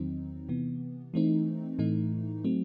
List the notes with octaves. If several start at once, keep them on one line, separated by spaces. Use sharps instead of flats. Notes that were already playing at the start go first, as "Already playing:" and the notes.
Already playing: E2 D#3 F#3 C4 D#4
C3 E3 B3
E3 A3 C4 D#4
A2 E3 A3 D#4
F#3 A3 C4